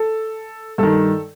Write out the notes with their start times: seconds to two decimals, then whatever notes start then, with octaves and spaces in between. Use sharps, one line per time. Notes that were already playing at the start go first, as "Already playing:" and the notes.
Already playing: A4
0.78 G2 D#3 A4